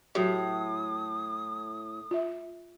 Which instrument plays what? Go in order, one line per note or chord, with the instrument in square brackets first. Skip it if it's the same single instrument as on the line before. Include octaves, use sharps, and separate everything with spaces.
[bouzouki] A2 [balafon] F#3 F#4 G4 [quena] D#6
[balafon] F4 E5